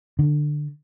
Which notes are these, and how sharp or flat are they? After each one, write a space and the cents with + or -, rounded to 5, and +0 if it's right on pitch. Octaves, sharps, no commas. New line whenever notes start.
D3 +15